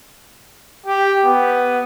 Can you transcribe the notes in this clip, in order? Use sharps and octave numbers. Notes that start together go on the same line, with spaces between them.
G4
B3